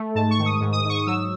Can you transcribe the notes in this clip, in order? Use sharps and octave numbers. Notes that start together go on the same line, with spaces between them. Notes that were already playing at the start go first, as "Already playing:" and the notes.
Already playing: A3
G#2 A5
C#6
D#3
D#6
G#2
D#6
G#2 C#6 D#6
D#6
F#3 E6